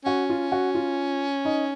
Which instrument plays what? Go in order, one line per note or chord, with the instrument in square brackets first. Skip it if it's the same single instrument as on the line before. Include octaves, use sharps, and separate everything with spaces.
[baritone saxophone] C#4 [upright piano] F#4
[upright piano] F4
F#4
F4
D#4